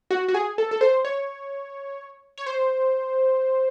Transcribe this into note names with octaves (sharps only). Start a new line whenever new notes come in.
F#4
F#4
G#4
A4
A4
C5
C#5
C#5
C5